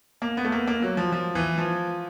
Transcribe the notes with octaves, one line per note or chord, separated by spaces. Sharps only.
A#3
B3
A3
A#3
A#3
F#3
F3
F3
E3
F3